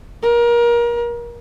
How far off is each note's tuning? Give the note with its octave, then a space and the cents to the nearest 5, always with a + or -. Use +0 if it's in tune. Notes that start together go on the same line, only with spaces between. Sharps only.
A#4 +30